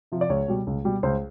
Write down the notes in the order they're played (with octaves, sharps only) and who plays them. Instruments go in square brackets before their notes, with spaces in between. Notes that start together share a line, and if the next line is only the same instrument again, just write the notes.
[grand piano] C3 F3
D5
C#2 C#5
B2 G3
C#2
B2 G3
C#2 C5